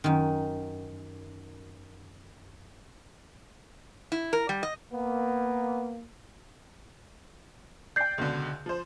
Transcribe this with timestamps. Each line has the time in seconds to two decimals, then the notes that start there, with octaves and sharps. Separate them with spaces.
0.04 F#2 D#3
4.12 E4
4.33 A#4
4.49 G3
4.63 D#5
4.92 A#3 B3
7.96 D5 G5 G6 C7
8.18 C#2 B2 D3
8.66 F3 C5